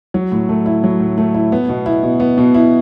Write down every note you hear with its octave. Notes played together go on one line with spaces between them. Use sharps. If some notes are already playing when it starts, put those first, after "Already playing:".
F#3
A2
A3
E4
F#3
A2
A3
E4
B3
B2
E4
B2
B3
B2
E4